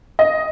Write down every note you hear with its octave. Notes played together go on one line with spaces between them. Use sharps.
D#5